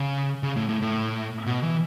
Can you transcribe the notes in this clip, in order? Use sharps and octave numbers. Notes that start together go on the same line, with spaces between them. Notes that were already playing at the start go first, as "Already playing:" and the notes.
Already playing: C#3
C#3
A2
A2
A2
B2
E3